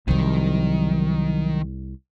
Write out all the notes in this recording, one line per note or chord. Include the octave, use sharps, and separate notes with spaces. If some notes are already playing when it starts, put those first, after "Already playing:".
C2 D#3 F3 F#3